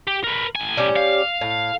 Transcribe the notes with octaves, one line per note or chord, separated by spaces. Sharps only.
G4
A#4 B4
A2 G#5
G3 C#4 G4
F5
A2